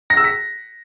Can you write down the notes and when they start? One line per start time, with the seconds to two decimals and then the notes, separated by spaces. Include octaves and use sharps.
0.10 A#6
0.17 E6
0.24 B6